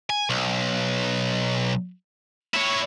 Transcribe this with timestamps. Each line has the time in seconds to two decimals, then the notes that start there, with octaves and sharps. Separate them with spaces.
0.10 G#5
0.30 B1
2.54 E4 C#5